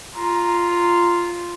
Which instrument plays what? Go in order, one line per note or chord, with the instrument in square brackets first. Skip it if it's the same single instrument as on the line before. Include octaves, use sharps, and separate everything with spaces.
[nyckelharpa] F4 [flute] A#5